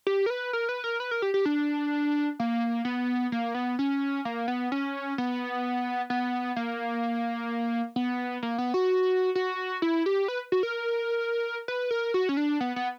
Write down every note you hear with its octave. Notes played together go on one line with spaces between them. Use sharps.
G4
A#4
B4
A#4
B4
A#4
B4
A#4
G4
G4
D4
A#3
B3
A#3
B3
C#4
A#3
B3
C#4
B3
B3
A#3
B3
A#3
B3
F#4
F#4
E4
G4
B4
F#4
A#4
B4
A#4
F#4
C#4
D4
B3
B3